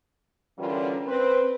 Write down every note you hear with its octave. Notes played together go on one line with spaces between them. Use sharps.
D3 E3 G3 C#4 F4 A#4
C4 B4 C5